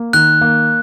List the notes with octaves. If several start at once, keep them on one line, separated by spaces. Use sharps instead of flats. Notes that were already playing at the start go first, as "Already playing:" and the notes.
Already playing: A#3
D#3 F#6
A#3